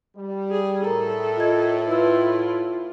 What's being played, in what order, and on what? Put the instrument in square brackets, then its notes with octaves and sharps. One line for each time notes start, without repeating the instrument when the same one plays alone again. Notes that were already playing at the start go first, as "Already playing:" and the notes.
[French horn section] G3
[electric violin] G#4
[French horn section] A2 [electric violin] A4 [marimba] A#4 A#5
[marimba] F4 D#5 G#6
[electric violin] E4 F4 [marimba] B4 E6